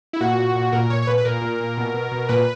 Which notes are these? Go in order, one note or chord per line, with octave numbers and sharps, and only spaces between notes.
E4
A#2 F#4
A#2
A#2
A#2 A#4
A#2 C#5
C#5
A#2 B4
B4
A#2 A#4
A#2
A#2
B2
B2
B2
A#2 B4